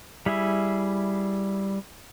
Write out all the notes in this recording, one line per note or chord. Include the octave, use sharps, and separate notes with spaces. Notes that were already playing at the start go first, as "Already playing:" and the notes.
G3 E4 G#4 E5